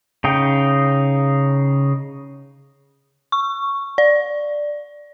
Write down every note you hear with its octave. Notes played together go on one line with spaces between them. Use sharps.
C#3 D#4 G5
C#6
D5